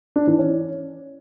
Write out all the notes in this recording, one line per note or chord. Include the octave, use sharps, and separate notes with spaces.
D4
E3
C#4